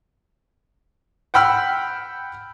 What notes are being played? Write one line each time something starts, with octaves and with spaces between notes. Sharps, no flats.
F#5 G5 B5 E6 F6